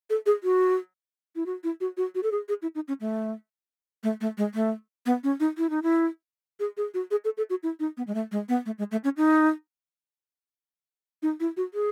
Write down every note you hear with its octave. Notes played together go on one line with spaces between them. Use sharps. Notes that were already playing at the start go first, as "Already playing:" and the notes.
A4
G#4
F#4
E4
F#4
E4
F#4
F#4
F#4
A4
G#4
G#4
E4
D#4
C#4
A3
A3
A3
G#3
A3
B3
C#4
D#4
E4
D#4
E4
G#4
G#4
F#4
G#4
A4
A4
F#4
E4
D#4
B3
G#3
A3
G#3
B3
A3
G#3
A3
C#4
D#4
D#4
E4
F#4
G#4